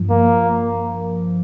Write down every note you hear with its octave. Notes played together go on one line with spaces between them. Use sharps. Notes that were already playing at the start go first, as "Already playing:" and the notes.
Already playing: G2 F3
A#3